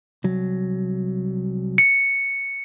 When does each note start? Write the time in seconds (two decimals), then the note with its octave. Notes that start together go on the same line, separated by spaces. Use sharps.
0.24 C2 F#3
1.78 C#7